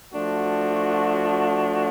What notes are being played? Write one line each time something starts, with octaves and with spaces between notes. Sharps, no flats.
F3 A3 D4 F#4